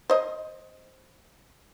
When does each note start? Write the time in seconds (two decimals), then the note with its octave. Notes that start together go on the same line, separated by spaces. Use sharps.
0.10 C5 D#5